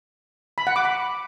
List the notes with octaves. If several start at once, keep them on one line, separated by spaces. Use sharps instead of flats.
B5
F#5
D6
B5